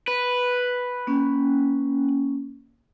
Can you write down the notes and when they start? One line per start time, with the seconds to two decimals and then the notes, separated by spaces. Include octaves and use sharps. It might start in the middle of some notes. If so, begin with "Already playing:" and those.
0.08 B4
1.07 A#3 C#4